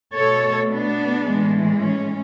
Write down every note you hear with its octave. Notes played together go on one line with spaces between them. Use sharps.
B2 A3 A4 C#5
B3 D4
A2 E3 G#3
C#4